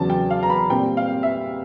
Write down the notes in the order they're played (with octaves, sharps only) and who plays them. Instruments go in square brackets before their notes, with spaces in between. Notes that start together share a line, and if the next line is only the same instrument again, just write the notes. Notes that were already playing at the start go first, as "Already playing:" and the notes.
Already playing: [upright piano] E2 C#3 F#3 A5
G5
F5
A#5
B5
A#2 G3 C4 G5
F5
E5